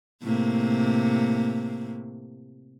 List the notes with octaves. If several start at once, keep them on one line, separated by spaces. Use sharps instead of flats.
A2 C3 A#3